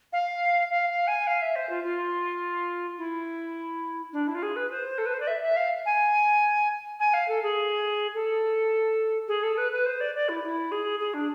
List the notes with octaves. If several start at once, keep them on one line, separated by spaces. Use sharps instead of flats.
F5
F5
F5
G#5
F5
E5
C5
F4
F4
E4
D4
E4
F4
G#4
B4
C5
A4
B4
C5
D5
E5
E5
F5
G#5
G#5
F5
A4
G#4
A4
G#4
A4
B4
B4
C5
D5
D5
E4
E4
G#4
G#4
D4